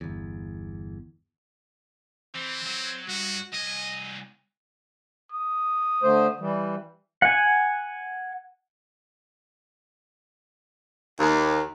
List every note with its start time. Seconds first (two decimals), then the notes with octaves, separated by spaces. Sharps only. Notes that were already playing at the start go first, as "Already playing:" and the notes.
0.01 G1 E2
2.35 E3 C4
2.66 F#3
3.08 G2 F#4
3.53 C2 D#5 G#5
5.32 D#6
6.03 D3 A3 C5
6.40 E3 G3
7.22 F#5 G#5
11.19 D#2